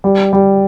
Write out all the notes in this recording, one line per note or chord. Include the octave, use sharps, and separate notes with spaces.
G3
G3